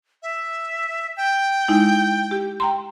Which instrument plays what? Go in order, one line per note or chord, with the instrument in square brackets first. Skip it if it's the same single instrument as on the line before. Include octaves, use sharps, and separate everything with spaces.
[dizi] E5
G5
[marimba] G#3 D#4 E4
G4
G5 A#5 C6